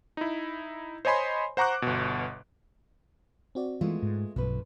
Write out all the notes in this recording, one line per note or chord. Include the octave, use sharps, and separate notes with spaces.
D#4 E4
C5 C#5 D#5 G#5 B5 C6
C5 F#5 A#5 C#6 D6 F#6
G1 B2
C4 F#4 D5
E3 G#3 A3 B3 F4
G#2
B1 G2 F3 C#4 B4